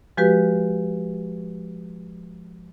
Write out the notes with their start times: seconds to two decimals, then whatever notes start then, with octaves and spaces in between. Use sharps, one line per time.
0.17 F3 G#3 F#4 G4 B4